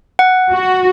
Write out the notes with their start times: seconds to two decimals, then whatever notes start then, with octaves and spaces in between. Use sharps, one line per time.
0.19 F#5
0.53 F#4